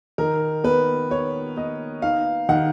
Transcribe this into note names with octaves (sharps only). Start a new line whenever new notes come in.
D#3 A#4
B3 B4
B3 C#5
B3 D#5
D#4 F5
D#3 F#5